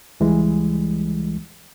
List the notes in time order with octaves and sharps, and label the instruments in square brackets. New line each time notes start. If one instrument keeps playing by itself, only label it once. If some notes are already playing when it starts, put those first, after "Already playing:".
[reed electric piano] C#2 E3 G3 G#3